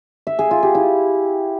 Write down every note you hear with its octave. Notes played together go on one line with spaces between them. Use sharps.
E5
G#4
F4
G4
E4